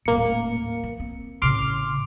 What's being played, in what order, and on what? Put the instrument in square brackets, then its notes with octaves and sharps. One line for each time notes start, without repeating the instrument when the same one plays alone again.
[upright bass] D#1 A2 [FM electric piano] A#3 C#7
[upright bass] E3
C4
[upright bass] A1 C#3 [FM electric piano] C6 D6 F6